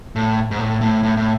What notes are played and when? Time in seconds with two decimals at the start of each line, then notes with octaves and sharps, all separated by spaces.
0.16 A2
0.51 G#2
0.59 A2
0.81 A2
1.03 A2
1.17 A2